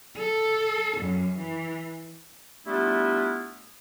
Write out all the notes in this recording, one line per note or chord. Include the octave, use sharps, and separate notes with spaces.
A4
F#2
E3
G3 A3 B3 D4 E4 F4